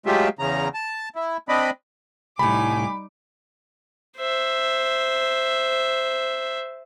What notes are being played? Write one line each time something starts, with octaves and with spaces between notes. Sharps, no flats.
F#3 G#3 A3 F4 G4 E5
E2 C#3 A#5
A5
E4
C4 D4 D5 D#5 B5
C2 A2 G3 D#4 G#5 B5 D6
C5 E5